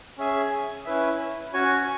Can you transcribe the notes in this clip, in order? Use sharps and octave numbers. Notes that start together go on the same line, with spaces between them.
C#4 G#4 E5 G#5
C#4 E4 B4 E5
C#4 F#4 C#5 G#5